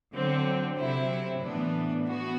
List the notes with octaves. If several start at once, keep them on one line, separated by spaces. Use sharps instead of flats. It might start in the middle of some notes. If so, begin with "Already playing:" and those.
D3 F#3 C4
C3 F#3 C4 E4
A2 E3 B3 D4
E3 B3 F#4